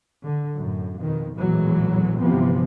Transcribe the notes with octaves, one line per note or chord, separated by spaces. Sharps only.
D3
F#2 A2
F2 B2 D#3
A#1 E2 A2 E3 F#3 G#3
G1 C3 E3 F3 B3 C4